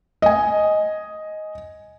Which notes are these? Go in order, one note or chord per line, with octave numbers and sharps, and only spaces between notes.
D#5 G#5